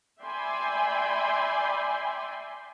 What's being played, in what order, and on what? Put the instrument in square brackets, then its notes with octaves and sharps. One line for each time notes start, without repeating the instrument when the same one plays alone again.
[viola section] D5 E5 G5 G#5 B5 C6